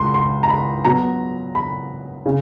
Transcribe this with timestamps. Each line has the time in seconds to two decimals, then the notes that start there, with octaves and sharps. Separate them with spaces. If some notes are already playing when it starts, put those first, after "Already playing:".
Already playing: C#2 G#3 C6
0.14 C6
0.43 A#5
0.49 B5
0.85 B2 F#3 B3 A#5
1.55 B5
2.26 C#3